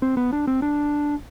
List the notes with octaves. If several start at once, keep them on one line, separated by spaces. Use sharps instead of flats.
C4
B3
D4
C4
D4